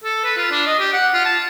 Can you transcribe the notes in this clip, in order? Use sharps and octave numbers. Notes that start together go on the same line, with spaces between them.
A4
B4
F4
D4
D#5
G4
F#5
F4
A5